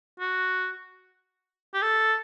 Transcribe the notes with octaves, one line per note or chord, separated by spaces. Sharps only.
F#4
G4
A4